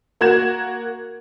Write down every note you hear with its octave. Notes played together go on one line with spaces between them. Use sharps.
A#3 F#4 G#6 E7